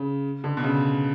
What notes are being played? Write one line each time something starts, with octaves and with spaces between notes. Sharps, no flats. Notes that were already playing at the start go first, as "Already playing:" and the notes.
Already playing: C#3
D3
B2
C#3